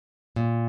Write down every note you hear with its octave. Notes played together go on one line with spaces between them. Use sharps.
A#2